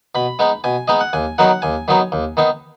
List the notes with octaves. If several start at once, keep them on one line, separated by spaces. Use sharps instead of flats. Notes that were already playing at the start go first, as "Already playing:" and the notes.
B2 B5
G#3 B3 D#4
B2 G#5
G#3 B3 D#4 D#5
F#5
D#2 G#5
D#3 F#3 B3 D#4 F#5
D#2 G#5
D#3 F#3 B3 D#4
D#2
D#3 B3 D#4